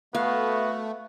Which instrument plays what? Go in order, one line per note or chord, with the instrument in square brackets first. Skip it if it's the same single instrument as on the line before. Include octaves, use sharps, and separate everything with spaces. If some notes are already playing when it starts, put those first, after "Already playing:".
[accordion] A3 [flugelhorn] B3 [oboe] F#4 [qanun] F5